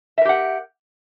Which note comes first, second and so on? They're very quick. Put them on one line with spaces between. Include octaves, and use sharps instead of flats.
E5 A#4 G4 F#5